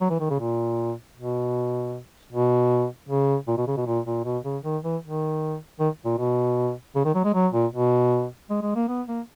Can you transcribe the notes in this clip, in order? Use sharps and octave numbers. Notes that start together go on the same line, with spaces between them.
F#3
E3
D#3
C#3
A#2
B2
B2
C#3
A#2
B2
C#3
B2
A#2
A#2
B2
C#3
D#3
E3
D#3
D#3
A#2
B2
C#3
D#3
F#3
G#3
F#3
A#2
B2
G#3
G#3
A#3
B3
A#3